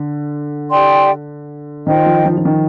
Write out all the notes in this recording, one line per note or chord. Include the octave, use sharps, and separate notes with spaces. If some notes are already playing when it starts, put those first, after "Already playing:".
Already playing: D3
G4 D5 G5 C6
D#3 F4 C5 D#5 G5
F3
F3
F3
D#3